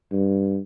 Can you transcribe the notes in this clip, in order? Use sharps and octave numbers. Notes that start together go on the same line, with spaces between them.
G2